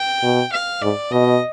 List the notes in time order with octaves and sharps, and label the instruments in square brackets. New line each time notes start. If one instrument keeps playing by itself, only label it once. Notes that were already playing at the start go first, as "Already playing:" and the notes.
Already playing: [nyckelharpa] G5
[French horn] B2
[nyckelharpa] F5
[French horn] G#2 [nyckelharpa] D5
[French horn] B2 [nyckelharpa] D#5